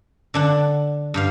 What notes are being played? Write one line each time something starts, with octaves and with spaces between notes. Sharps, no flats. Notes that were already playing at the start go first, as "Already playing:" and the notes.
D3 D4 F#5
G2 G4 F5